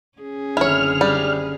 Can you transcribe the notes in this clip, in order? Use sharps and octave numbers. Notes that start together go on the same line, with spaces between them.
C#4 G#4
F#1 D3 C4 E4 C#5 F6
G3